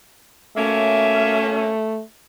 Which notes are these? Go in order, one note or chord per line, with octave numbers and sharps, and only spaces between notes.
B2 A3 A#3 C#4 E5